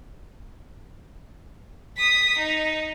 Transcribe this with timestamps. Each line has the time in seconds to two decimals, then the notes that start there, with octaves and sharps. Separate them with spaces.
1.97 D#6 B6
2.38 D#4